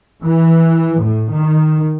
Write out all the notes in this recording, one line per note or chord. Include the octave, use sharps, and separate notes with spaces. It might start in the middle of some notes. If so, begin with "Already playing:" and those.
E3
A2
D#3